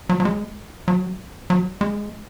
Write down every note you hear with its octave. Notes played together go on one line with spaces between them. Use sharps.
F#3
F#3
G#3
F#3
F#3
G#3